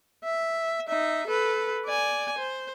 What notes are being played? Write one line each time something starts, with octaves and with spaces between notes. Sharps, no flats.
E5
D#4 E5
A4 B4
D5 G#5
C5